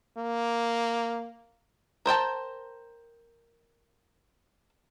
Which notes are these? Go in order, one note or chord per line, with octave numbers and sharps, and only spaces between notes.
A#3
A#4 C5 G5 A5